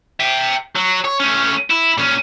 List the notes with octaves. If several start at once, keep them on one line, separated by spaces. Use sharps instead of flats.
E5 G5
F#3
C#5
A3 C#4
E4
A#2 C#4